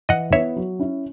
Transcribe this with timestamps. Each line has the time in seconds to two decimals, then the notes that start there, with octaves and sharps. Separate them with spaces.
0.09 E3 D#5 F#5
0.33 B3 E4 B4 C#5 E5
0.56 F#3
0.79 C#4 E4